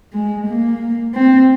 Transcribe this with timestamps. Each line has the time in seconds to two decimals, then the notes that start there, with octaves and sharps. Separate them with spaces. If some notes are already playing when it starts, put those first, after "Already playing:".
0.14 G#3
0.47 A#3
1.14 C4